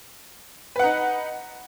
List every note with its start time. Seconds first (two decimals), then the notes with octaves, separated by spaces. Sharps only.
0.76 B4
0.79 F#5
0.83 D#4